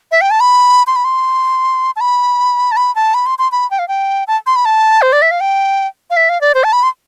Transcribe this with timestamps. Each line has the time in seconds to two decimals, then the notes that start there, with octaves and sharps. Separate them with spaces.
0.12 E5
0.21 G5
0.31 A5
0.40 B5
0.87 C6
0.96 B5
1.05 C6
1.96 A5
2.01 B5
2.72 A5
2.77 B5
2.95 A5
3.14 B5
3.26 C6
3.39 C6
3.52 B5
3.71 G5
3.79 F5
3.88 G5
4.28 A5
4.47 C6
4.56 B5
4.65 A5
5.02 C5
5.13 D5
5.22 E5
5.31 F5
5.41 G5
6.10 F5
6.17 E5
6.29 F5
6.41 D5
6.55 C5
6.64 A5
6.73 B5
6.83 C6